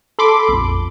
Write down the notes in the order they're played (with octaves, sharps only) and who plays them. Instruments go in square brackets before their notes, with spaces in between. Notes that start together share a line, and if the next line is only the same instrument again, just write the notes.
[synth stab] A4 B5 C6 D6
A#1 F2